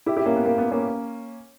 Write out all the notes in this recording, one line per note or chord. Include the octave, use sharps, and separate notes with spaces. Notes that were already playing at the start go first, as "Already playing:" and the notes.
E4 G4
E4 G4
A#3 C#4
B3
A#3
B3
A#3 C#4